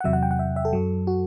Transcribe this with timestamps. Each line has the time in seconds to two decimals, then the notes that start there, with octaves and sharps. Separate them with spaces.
0.01 F#5
0.04 E2 C3 F#3 E5
0.13 F#5
0.23 G5
0.31 F#5
0.39 E5
0.56 E5
0.65 A4
0.73 F#2 F#3
1.07 F#4